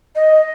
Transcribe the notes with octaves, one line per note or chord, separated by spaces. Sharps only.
D#5